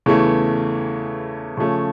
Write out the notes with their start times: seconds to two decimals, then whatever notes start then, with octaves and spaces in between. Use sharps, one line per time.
0.06 E2 C#3 E3 A3
1.57 C#3 F3 A3 C#4